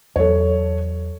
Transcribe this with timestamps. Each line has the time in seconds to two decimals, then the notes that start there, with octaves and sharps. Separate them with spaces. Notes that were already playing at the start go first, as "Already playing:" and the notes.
0.16 E2 F#3 A4 C#5